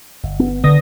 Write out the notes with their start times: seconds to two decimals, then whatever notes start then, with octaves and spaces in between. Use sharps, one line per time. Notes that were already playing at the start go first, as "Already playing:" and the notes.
0.24 G1
0.39 B3
0.64 D3 B3 D#6 A#6